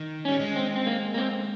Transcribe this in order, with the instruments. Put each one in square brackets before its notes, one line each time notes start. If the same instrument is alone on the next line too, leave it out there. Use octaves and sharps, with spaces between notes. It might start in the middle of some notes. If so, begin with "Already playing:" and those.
Already playing: [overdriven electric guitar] D#3
[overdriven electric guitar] G3 [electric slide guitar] C#4
[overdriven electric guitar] G#3
[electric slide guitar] C4
C4
A#3
A#3
C4